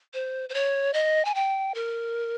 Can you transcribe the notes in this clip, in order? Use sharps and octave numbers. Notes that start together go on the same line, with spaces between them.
C5
C5
C#5
D#5
G#5
G5
A#4